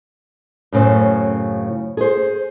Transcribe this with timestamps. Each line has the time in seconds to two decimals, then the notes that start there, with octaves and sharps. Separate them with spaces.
0.72 F#2 A2 C#3 C4
1.97 G#4 C5